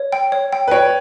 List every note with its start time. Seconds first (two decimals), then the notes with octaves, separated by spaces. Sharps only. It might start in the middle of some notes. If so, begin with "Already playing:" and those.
Already playing: C#5
0.12 G5
0.32 C#5
0.53 G5
0.68 B4
0.71 C#5 G5